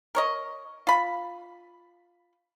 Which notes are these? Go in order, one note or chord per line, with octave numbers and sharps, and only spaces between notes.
A#4 C#5 D#5
F4 B5